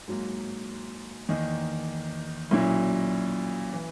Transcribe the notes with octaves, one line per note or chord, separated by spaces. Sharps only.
G#2 F#3 A#3
E2 D#3 A#3 D#4
B1 A#2 F#3 C#4 E4
E3